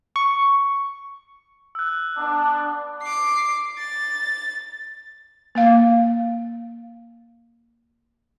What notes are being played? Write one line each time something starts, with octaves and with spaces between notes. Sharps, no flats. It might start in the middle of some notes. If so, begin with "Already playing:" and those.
C#6
E6 F#6
B3 D4
D6 C7
A6
A#3 F5